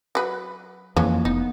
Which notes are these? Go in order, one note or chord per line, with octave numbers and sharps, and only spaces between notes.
F#3 B4
F2 E3 G#3 A#3 C#4
F1 B3 D#4